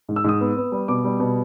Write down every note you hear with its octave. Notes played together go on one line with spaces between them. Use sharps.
G#2
E6
G#2 D#6
B3
B3
G3
B2 D6
G3
B2